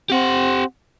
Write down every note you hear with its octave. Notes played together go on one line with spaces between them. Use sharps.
C4 G4 F#5